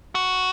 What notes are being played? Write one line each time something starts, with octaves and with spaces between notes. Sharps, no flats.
F#4